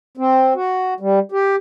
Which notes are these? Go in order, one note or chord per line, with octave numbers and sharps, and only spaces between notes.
C4
F#4
G3
G4